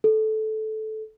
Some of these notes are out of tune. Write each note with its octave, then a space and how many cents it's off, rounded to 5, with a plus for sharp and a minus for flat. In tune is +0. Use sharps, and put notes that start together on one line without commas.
A4 -15